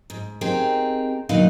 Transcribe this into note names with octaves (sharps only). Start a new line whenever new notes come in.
G#2
C4 D#4 G4 G#4 A#4
A#2 D3 F#3 D#4 B4 F5